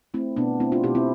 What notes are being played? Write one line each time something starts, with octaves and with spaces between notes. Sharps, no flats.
A3 C4 E4
B2 B3 D4
A3 C4 E4
D4 F4
B2 E4 G4
C4 E4